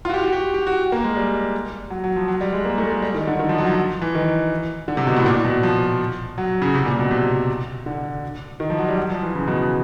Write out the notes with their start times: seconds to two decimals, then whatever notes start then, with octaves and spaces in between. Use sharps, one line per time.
0.05 F4
0.09 F#4
0.14 G4
0.24 F#4
0.33 G4
0.54 G4
0.67 F#4
0.92 A#3
1.04 G#3
1.17 G3
1.90 F#3
2.04 F#3
2.16 F3
2.28 F#3
2.41 G3
2.52 G#3
2.65 A#3
2.78 A3
2.90 G#3
3.02 G3
3.14 D#3
3.27 D3
3.39 D#3
3.49 F3
3.58 F#3
3.67 F3
4.02 E3
4.15 D#3
4.88 D3
4.97 C3
5.07 B2
5.17 A2
5.26 A#2
5.44 B2
5.63 F3
6.38 F#3
6.62 C#3
6.74 C3
6.86 A#2
6.99 B2
7.11 C3
7.86 D3
8.60 D#3
8.70 F3
8.78 F#3
8.89 G3
8.97 F#3
9.10 F3
9.22 E3
9.35 C#3
9.47 B2